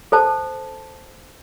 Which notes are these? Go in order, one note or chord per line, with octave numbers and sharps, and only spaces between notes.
A4 C5 A5